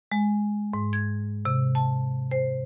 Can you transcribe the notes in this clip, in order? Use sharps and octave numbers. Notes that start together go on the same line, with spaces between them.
G#3
G#2
G#6
C3
A5
C5